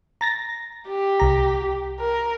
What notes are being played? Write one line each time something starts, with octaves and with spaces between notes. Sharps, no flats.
A#5 A6 A#6
G4
C2 A#5
A#4